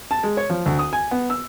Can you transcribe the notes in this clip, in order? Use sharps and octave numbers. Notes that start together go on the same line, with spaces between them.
A5
G#3
C#5
F3
D2
D#6
G#5
B3
E6